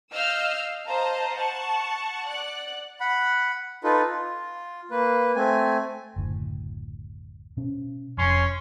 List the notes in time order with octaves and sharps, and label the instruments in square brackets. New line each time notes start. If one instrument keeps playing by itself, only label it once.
[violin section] D#5 F5 E6 F6 G6
C5 D#5 F5 A5 A#5
F#5 A5 C#6
D5 F#5 F#6
[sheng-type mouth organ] F#5 B5
D#4 F4 A4 B4
F4
A#3 B4
A3 C4 G#5
[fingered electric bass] F#1 D2 A2
B2 C#4
[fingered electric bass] F1 F2 [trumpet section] C#4 C#5 C6